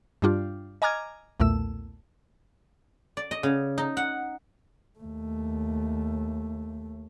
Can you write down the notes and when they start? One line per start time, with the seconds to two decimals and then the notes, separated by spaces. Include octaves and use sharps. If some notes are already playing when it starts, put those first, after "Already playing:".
0.22 G2 G3 D4 F4 G4
0.82 D#5 G#5 A#5 D6 F6 G#6
1.40 B1 E2 A#2 A3 E6
3.17 D5
3.31 D#5
3.43 C#3
3.78 D#4
3.97 F#5
5.00 D#2 A3